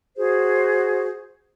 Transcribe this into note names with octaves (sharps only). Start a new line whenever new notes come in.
F#4 G#4 C5